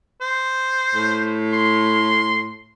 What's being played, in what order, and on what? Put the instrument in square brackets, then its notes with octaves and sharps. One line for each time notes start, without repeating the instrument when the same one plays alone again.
[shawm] C5
[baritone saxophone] A2
[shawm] C6